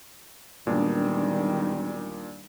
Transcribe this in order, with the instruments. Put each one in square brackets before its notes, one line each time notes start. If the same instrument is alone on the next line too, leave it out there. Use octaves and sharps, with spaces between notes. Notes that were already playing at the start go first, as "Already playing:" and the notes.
[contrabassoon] E1 [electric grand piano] A#2 D4 [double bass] D#3 G3